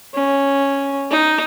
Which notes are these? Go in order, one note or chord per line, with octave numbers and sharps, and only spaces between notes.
C#4
D#4